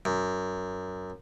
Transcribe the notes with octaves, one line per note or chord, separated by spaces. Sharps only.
F#2